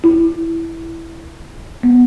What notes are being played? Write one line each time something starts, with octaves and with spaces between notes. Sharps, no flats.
E4
B3